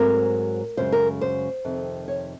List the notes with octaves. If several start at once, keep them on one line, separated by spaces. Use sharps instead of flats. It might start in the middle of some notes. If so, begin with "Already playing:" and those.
Already playing: G#2 F#3 C4 A#4
F#2 C#3 G#3 C5
A#4
C5
F2 C3 D#3
C#5